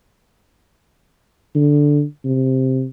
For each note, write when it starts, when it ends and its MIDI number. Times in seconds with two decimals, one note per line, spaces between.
1.55 2.03 50
2.24 2.86 48